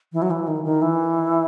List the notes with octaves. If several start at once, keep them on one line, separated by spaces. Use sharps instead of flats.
E3
F#3
E3
D#3
D#3
E3